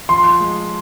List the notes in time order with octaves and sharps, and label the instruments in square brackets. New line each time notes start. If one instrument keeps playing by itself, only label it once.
[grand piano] F3 C6
G#3